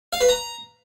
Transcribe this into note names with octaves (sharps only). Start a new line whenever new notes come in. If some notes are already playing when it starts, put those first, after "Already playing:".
F5
B4
A#5